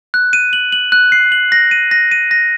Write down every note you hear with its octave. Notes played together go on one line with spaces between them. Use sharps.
F#6
D#7
F#7
F#7
F#6
C7
F#7
A#6
D#7
A#6
D#7
A#6